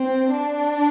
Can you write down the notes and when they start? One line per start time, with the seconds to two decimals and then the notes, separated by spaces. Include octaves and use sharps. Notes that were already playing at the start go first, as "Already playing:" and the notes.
Already playing: C4
0.33 D4